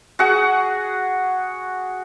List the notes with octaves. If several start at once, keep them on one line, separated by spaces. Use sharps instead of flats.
F#4 G#4 F#5